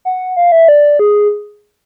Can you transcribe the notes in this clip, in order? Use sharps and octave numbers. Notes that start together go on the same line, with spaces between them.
F#5
F5
E5
D5
G#4